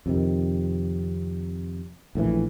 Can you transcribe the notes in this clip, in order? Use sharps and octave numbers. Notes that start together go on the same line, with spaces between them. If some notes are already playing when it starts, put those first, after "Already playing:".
F2 C3 D#3
A#1 A2 D#3 E3